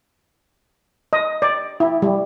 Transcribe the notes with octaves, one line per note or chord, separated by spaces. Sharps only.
D#5
D5
E4
G3